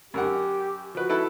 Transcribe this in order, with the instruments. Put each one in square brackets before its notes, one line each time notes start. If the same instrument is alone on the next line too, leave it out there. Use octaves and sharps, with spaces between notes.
[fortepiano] F#2 A#4 F#5 [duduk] G4
[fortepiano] F3 B4 [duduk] F#4
[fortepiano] E4 A4 B4